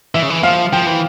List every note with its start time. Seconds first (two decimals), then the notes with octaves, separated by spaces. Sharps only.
0.14 E3 E5
0.22 C#3
0.30 E3
0.43 F3 F5
0.73 F3 G5
0.86 E3